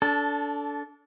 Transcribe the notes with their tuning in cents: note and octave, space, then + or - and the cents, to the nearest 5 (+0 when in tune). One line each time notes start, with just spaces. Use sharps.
D4 -25 A4 +0